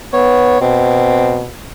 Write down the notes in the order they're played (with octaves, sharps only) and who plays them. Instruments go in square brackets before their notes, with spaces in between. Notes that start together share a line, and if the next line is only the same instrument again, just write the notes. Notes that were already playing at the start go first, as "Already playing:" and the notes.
[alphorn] B3 [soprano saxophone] C#5
[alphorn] B2 [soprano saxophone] C4